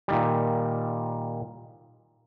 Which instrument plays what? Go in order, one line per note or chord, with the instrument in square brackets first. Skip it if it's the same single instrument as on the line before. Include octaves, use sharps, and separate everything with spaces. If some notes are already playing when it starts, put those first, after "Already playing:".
[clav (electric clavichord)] A#2 D#3 G3